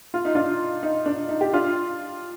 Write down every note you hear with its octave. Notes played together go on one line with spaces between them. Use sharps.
F4
D#4
D4 F4
D#4
D4
D#4
G4
D4 F4